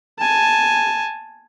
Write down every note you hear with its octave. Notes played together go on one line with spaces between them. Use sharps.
G#5 A5